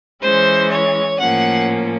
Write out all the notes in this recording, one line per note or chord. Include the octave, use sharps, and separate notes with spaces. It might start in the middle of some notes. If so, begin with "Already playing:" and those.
E3 G#3 C#4 C5
C#5
A2 F3 A#3 C#4 F#5